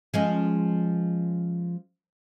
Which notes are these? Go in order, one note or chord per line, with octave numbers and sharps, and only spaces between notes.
F3 G#3 C#4